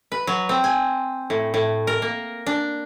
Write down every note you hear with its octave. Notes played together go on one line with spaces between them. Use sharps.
B4
F#3
C4
G#5
A2
A2
A#4
A#3
D4